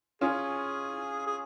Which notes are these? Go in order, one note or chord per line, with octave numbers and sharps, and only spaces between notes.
C#4 F4 G#4
G#4